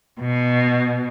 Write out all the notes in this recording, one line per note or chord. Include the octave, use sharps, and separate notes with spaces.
B2